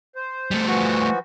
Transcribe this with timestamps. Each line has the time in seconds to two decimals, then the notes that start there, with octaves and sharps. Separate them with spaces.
0.16 C5
0.51 G3 A3
0.67 E3 F3 F#4